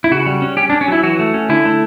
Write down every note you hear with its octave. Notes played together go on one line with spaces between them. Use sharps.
E4
C#3 F#4
G3
C#4
C#4 G4
C#4 D4
C#4
F#3 E4
E3 F#4
A3
C#4
D3 E4
A3